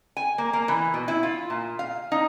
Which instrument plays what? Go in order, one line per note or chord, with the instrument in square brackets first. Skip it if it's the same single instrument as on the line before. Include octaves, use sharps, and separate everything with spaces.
[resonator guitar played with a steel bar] G#5
A#3
A#3
E3
B2
E4
F4
A#2
F5
D#4